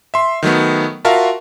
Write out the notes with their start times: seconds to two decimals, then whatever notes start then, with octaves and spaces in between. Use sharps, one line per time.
0.14 E5 C6
0.43 D#3 F#3 A3 B3
1.05 F4 F#4 A#4 E5 F5 A5